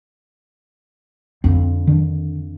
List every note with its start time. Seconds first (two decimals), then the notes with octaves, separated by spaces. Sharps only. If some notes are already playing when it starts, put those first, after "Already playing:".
1.44 F2 D3 C4
1.87 D#3 D4